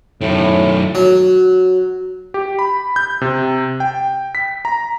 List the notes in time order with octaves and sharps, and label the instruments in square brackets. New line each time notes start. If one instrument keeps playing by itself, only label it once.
[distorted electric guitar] F#2 D#3 [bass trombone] A2
[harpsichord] F#3
[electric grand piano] G4
B5
G6
C3
G5
B6
A#5